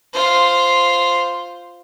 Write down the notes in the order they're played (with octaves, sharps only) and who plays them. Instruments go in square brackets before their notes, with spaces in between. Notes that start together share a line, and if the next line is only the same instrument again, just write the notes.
[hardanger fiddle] F4 C5